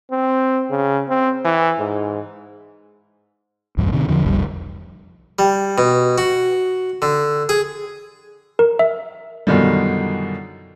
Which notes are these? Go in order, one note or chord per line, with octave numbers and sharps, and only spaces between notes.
C4
C#3
C4
E3
G#2
B1 E2 G2
A2 C3 D#3
E2 D3 F3
F1 B1 F2 G3
G3
B2
F#4
D3
G#4
A#4
E5
F#2 B2 D3 D#3 F3 G3